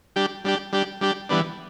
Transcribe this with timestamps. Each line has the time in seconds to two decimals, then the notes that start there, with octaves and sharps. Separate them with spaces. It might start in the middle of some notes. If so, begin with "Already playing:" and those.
0.16 G3 D4 G4
0.45 G3 D4 G4
0.73 G3 D4 G4
1.01 G3 D4 G4
1.29 E3 G3 B3 D4